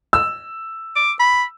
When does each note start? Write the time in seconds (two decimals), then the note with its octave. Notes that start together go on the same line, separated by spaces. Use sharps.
0.13 E6
0.96 D6
1.20 B5